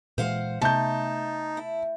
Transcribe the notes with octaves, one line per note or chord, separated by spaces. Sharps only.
A#2 E3 G#3 C5 F5 F#5
C3 A3 B3 D#4 A5 G6
E4